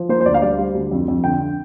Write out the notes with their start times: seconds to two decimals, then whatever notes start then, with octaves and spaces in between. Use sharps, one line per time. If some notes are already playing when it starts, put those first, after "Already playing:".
Already playing: F3
0.09 A#3 C5
0.20 C5
0.25 D2 D5
0.34 F5
0.42 G3 D5
0.51 C5
0.59 G3
0.75 D2
0.91 F2
1.08 F2
1.24 D3 G5